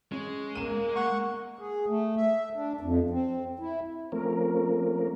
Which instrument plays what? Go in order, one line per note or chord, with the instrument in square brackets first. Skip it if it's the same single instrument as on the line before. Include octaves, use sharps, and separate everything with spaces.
[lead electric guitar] G#3 [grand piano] C#4
[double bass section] A#3 [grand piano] D#7 E7
[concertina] F#5 C#6
[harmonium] G#4
A3
E5
D4
F2
C4
E4
[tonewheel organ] F3 A3 A#3 C4 C#4 A#4